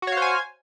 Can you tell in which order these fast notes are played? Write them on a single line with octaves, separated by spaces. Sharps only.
F#4 C#5 F5 C5 G#5